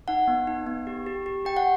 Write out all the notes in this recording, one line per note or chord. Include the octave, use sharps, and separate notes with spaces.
D#4 F#5
B3
D#4
B3
G4
G4
G4
G4 G5
F#5